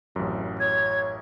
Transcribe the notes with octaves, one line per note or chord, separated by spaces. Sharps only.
A1 F#2 C3
C#5 G#6